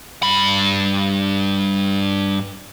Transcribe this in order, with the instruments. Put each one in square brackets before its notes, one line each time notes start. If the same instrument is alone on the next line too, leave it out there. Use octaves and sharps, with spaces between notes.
[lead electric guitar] G2 B5